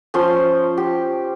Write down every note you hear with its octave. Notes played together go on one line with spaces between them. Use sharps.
F3 C#4 C5 C6
G4